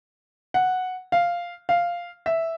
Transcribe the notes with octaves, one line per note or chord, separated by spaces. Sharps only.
F#5
F5
F5
E5